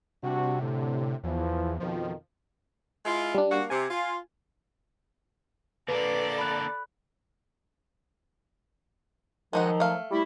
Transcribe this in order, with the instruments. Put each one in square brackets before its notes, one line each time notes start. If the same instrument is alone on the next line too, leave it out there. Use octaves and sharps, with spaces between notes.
[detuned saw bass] C3 [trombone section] G3 D4 F#4
[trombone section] A2 D3
[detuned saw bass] E2 [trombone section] E3 F3
[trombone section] F2 B2 D#3 [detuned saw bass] F3
[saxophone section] G#3 E4 F4
[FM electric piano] G3 D4
[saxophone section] A#3 F#4
[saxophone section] C3 [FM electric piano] G#5
[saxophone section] F4
[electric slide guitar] D3 A#3 D4 [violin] A4 D5 [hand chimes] B4
[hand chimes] B5 F#6
[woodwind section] D#3 F3 F#3 [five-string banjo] G#3 D#4 F#4
[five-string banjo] A3 F5
[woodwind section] G3 A3 E4